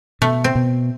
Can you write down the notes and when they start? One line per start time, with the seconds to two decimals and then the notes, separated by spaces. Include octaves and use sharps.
0.21 B2 A3
0.44 C4
0.55 B2